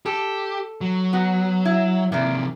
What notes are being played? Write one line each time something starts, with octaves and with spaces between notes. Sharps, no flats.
G4 A4
F#3
B3 F#4
E4
C3 D#3 E3 A#3 D5